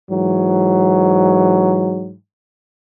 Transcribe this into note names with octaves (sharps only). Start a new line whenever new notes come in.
G#2 E3 F#3